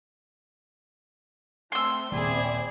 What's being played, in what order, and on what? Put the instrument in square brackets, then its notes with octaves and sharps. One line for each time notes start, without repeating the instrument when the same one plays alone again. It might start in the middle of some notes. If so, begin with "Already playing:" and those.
[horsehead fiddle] A3 C4 [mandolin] C6 E6
[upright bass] D#1 [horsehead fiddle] C4 D5 [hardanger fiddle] E4 G#4